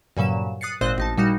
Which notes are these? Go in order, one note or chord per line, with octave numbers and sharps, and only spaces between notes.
G2 A#2 C#3 F#3 E7
D#6 F#6 A6 C7 C#7
G#1 A#2 C4 C5 D#5 F#6
A1 D#4 A5
A#2 G3 D#4 F#4